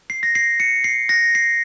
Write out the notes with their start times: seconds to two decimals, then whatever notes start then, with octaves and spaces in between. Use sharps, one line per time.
0.10 C7
0.23 A#6
0.35 C7
0.60 C#7
0.84 C7
1.09 A#6
1.35 C7